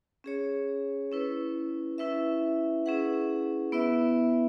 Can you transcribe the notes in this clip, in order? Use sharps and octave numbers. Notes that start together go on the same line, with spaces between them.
C#4 G#4 C#5
C#4 E4 B4
C#4 E4 B4 E5
C#4 E4 G#4 B4 F#5
B3 E4 B4 E5